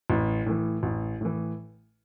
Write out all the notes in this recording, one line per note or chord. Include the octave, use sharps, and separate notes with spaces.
A1
A2 E3
A1
A2 E3